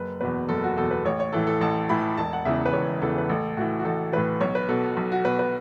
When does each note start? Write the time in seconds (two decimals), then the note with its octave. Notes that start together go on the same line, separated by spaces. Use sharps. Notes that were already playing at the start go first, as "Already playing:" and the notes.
Already playing: F#1 B4
0.21 E2 B2 B4
0.49 F#1 A4
0.64 F#4
0.77 E2 B2 A4
0.91 B4
1.05 A1 C#5
1.20 C#5
1.33 A2 E3 A4
1.47 A4
1.61 A1 A5
1.89 A2 E3 B5
2.17 E1 A5
2.33 F#5
2.45 E2 C#3 E3 E5
2.66 B4
2.73 E1 C#5
3.02 E2 C#3 E3 A4
3.18 B4
3.29 A1 A4
3.57 A2 E3 F#4
3.79 F#4
3.85 A1 A4
4.12 A2 E3 B4
4.40 B1 C#5
4.55 B4
4.68 B2 A4
4.97 B1
5.12 F#4
5.25 B2 B4
5.39 B4